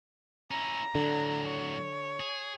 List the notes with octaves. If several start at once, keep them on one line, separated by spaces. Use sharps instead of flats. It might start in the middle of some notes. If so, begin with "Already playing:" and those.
C#4 E4 A#5
A2 D3 F#3
C#5
G#4